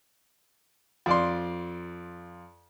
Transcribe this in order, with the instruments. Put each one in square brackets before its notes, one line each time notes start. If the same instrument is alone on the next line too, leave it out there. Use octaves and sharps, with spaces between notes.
[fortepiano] F2 D5 C6